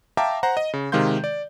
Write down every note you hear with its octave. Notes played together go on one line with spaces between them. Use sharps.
E5 F5 G5 A5 A#5 D6
C5 F#5 A#5
D#5
C#3
C3 D#3 G#3 F5 C6 G6
D5